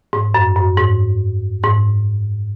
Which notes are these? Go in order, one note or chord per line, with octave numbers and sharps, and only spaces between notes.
G#2
F#2
F#2
G#2
G#2